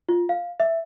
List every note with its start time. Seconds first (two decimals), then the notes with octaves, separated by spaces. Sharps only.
0.09 F4
0.29 F5
0.60 E5